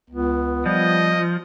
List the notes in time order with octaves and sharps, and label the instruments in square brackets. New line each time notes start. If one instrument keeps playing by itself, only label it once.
[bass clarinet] C#2 [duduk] B3
[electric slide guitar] F3 [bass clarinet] G3 [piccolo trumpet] D#5